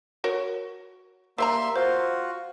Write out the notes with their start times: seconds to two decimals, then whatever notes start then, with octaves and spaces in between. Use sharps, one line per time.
0.24 F#4 A#4 C#5
1.38 G3 A#3 C#5 E5 A#5 C6
1.76 F4 F#4 C5